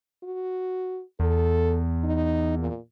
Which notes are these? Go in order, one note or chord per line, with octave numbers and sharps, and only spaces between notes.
F#4
E2 A4
D#4
A#2